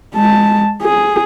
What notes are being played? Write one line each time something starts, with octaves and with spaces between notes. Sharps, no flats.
G#3 A5
G#4